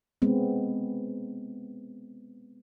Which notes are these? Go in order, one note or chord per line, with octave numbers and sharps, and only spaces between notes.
G#3 B3 C4